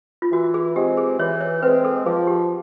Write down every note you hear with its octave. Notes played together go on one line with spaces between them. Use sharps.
F4
E3 F#4
G#4
G#3 C4 G4
G#4
E3 C#5
C#5
G#3 C4 B4
A4
F3 G#4
G4